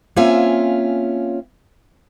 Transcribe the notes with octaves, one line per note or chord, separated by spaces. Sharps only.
A#3 C4 C#4 F4 E5 G#5